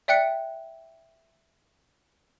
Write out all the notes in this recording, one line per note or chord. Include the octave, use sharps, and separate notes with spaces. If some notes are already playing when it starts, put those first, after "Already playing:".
D5 E5 G5 F#6 C#7